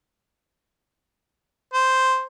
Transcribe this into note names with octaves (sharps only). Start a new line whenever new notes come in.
C5